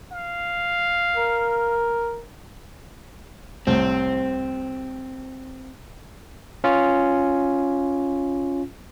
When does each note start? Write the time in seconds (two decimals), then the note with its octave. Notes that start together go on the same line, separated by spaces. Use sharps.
0.12 F5
1.16 A#4
3.67 C2 A2 C4
6.64 C#4 F4